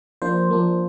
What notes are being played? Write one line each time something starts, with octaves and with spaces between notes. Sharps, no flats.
F3 A#3 D4 C5
F3 A#3 D4